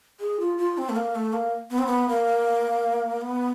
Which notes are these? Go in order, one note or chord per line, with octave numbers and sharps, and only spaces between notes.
G#4
F4
F4
C4
A3
A#3
A3
A#3
B3
C4
B3
A#3
B3